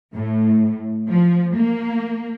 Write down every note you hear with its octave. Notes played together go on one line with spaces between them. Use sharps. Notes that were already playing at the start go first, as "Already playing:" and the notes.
A2
F3
A#3